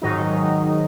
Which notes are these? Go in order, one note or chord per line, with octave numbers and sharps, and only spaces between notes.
G#2 D#3 F#3 D#4